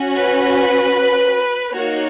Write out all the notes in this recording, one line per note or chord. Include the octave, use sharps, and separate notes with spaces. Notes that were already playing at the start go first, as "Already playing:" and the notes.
Already playing: C#4 F#4
B4
A#3 D#4 F#4 C#5